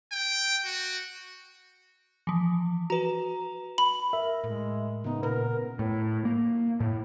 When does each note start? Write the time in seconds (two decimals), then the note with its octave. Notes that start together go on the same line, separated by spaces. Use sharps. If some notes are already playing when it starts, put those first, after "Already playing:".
0.12 G5
0.65 F#4
2.27 E3 F3
2.90 F#4 B4 A#5
3.78 B5
4.13 A#4 E5
4.44 A2 G#3
5.04 C#3 B3 D#4
5.23 A#2 A#4 B4
5.79 A2
6.25 A#3
6.80 A2